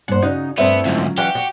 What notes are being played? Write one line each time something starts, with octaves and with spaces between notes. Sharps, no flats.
G2 A#3 C5 F#5
C#3 C#4 D#4 F#4
G2 A3 B3 C4 E4
D2 G#2 F#3 C#4 F4
E3 F#4 G4 F5
F#4